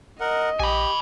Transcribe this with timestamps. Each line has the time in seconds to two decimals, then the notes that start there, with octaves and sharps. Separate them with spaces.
0.21 A#4 D#5 F#5
0.60 A#1 G4 G#5 B5